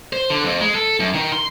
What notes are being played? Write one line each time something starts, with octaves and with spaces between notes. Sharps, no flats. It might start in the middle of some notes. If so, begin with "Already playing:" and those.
C5
D3
F2
G#3
A4
F#2
D#3
C6